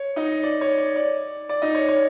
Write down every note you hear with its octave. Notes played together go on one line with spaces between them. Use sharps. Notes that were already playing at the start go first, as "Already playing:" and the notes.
Already playing: C#5
D#4 D#5
D5
C#5
D5
D5
D5
D#4 D#5
C#5
C#5